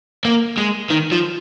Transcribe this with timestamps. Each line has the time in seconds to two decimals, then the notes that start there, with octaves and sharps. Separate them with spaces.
0.25 A#3
0.58 G#3
0.90 D#3
1.12 F3